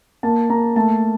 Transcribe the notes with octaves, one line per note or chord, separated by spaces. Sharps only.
A#3 A5
A#3 A#5
A3 A5